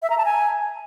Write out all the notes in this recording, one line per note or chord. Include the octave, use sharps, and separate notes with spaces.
E5
A#5
A5
G#5